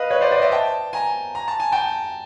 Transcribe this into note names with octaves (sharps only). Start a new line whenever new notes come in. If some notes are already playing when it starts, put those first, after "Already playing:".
Already playing: B4 D#5 F5
B4 C#5
C5 D5
C5 D5
D#5
D5 E5
G5 A5
G#5 A#5
A#5
A5
G#5
G5 A5